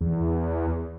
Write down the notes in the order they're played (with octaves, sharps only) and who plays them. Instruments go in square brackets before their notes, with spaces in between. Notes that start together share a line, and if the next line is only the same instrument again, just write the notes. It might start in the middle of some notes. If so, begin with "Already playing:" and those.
[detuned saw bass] E2